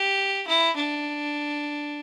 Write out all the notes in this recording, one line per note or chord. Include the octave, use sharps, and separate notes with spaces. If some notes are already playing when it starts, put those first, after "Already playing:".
Already playing: G4
E4
D4